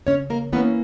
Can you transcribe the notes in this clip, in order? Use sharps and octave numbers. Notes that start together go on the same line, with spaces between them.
C#3 C#4 C#5
A#3 A#4
E3 A#3 B3 C#4 B4